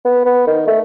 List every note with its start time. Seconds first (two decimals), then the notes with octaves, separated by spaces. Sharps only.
0.05 B3
0.26 B3
0.47 D#3
0.67 A3